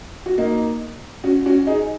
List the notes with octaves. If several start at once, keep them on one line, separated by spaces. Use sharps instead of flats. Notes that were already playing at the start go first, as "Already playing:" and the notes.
F#4
A#3 D#4
C#4 F#4
C#4 F#4
D#4 G#4